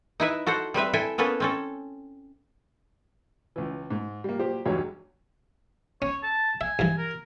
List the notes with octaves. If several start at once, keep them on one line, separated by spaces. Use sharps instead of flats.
D#4 E4 B4 E5
F#4 A4 C5 F#5
G3 C4 B4 E5
E4 A4 E5 G5 G#5
A#3 B3 C#4 A4 B4
C4 C#4 A4
C#2 E3
G#2
G3 A#3
A#2 F#3 G4 C5
B1 E2 G2 F#3 G#3 C#5
C#4 C#5
A5
E5 G#5
G2 E3
A#4